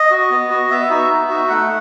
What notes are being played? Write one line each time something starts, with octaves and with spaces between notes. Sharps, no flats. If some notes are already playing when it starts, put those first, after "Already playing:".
Already playing: D#5
F#4
B3
F#4
B3 E5
D#4 F#4
B3
D#4 F#4
A3 F#5